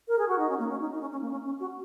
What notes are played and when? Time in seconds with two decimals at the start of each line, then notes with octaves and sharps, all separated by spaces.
0.08 A#4
0.19 G#4
0.28 F#4
0.39 D#4
0.49 C#4
0.59 A#3
0.70 C#4
0.80 D#4
0.93 D#4
1.01 C#4
1.11 C#4
1.21 A#3
1.31 C#4
1.45 C#4
1.60 F#4